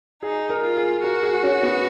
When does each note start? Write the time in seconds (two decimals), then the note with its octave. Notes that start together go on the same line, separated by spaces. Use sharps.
0.22 D#4 G#4
0.49 A#4
0.63 F4
0.77 G#4
1.03 F#4 A#4
1.23 G#4
1.43 C#4
1.63 B3